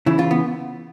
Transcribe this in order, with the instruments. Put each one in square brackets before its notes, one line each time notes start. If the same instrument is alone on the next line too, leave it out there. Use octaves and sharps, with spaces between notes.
[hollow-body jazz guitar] C#3 E3 E4
F4
B3